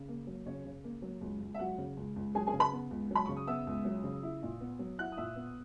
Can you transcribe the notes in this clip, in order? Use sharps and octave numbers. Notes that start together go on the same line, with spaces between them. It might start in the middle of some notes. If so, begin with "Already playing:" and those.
Already playing: C#3
A#3
F#3
C#3 C#4 C#5
C#3
A#3
F#3
C#2
C#2
E5
F#3 F#4 F#5
C#3
C#2
C#2
F#3 G#4 G#5
G#4 G#5
C#3
B4 B5
B3
C#2
F#3 B5
C#3 C#6
D#6
B3 E5 E6
C#2
F#3
C#3
E4
A#2
B3
F#3
E4 F#5 F#6
D#6
A#2 E5 E6
B3